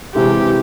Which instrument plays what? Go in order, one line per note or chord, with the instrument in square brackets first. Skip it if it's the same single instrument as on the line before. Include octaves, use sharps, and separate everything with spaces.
[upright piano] C3 E3 G#3 E4 [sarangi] G4